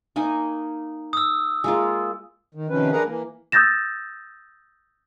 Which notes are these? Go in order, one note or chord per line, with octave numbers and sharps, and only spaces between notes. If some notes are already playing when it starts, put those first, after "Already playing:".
A#3 D#4 G#5
D#6 E6
G#3 A#3 F4
D#3
C3 D#3 F3 C#4 B4
D4 G#4 A#4 B4 F#5 A#5
E3 A#3
D#6 E6 G6 A6 A#6 E7